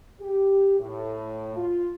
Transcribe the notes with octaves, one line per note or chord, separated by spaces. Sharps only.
G4
A2
F4